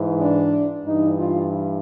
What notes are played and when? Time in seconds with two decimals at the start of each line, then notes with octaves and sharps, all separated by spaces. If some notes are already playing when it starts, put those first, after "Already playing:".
Already playing: G#2 E3
0.21 D4
0.86 G2 E3 D#4
1.19 F4